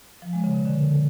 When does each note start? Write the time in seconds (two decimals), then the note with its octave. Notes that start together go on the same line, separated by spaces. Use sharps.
0.22 F3
0.33 G#3
0.44 C#3
0.55 B2
0.65 D3